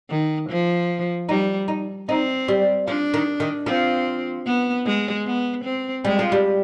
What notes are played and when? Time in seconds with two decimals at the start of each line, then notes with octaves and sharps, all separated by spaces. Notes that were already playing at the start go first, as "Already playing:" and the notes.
0.10 D#3
0.49 F3
1.29 G3 D#4
1.68 D#4
2.09 C4 D#4
2.48 G3
2.87 F3 D4
3.14 D#3
3.40 D#3
3.66 F3 C4
4.46 B3
4.85 G#3
5.26 B3
5.64 C4
6.05 G3 G#3
6.19 F3
6.32 G3